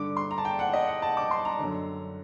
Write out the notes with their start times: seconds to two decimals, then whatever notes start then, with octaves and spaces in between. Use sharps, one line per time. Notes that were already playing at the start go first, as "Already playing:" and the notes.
Already playing: G2 D3 D6
0.17 C6
0.31 A#5
0.38 A5
0.45 G5
0.59 F#5
0.73 D#5
0.88 F#5
1.02 A5
1.17 D6
1.31 C6
1.45 A#5
1.59 F#2 D3